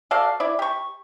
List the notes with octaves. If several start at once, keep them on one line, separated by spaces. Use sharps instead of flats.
F#4 A4 D5 F5
E4 D5
G4 C#6